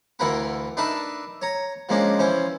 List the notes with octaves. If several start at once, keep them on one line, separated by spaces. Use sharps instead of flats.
D2 E3 F4 A#4 F#5 B5
D4 D#4 A#4 B4 E5 A5
C#5 A#5
F3 G#3 A#3 C#4 D4
E3 F3 C#4 C5